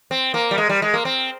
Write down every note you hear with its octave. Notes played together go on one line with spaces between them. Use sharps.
C4
A#3
G3
G#3
G3
G#3
A#3
C4